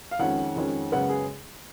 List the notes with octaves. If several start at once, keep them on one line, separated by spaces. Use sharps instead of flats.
F5
F2 D#3 G#3 C#4 F#5
F2 D#3 G#3 C#4
F#2 C#3 G#3 B3 F#5
G#4